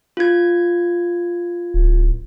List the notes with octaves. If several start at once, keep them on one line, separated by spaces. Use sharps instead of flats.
F4 G#6
D1